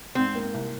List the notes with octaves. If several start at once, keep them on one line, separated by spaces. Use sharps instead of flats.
G#2 C4
A#3
C2